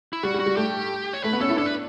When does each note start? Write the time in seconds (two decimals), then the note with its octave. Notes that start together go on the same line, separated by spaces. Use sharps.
0.13 E4
0.23 G3 F#4
0.34 G3
0.40 F#4
0.46 G3
0.57 A3 G4
1.13 C#5
1.24 A3 B4
1.33 B3
1.41 C#4 A4
1.50 E4
1.57 D4 A4
1.66 B4